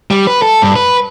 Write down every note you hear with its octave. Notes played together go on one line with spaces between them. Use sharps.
G3
B4
A4
G2
B4